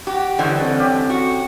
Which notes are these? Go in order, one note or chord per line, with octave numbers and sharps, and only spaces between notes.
F#4 G4
D3 E3 G3 F#4 C5 C#5 D#5 E5
C4 A4 F#6
C#4 G4
F#4